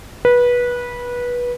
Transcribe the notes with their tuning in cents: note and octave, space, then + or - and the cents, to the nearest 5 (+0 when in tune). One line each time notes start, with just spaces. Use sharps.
B4 -20